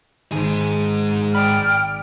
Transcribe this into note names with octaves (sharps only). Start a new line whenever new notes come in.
G#1 G#2 G#4
D5 G5 B5 D6 D#6 F6